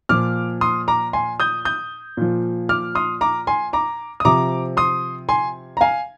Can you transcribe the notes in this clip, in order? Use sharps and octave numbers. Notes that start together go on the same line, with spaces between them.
A#2 F3 D6 F6
C6 D#6
A#5 D6
G#5 C6
D#6 G6
D#6 G6
A#2 F3
D6 F6
C6 D#6
A#5 D6
G#5 C6
A#5 D6
D#6
C3 F3 A#5 D6
C6 D#6
G#5 C6
A#5
F5 G#5